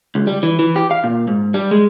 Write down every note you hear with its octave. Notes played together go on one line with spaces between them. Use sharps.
C#2
G3
E3
E3
G4
F5
A#2
G#2
G3
G#3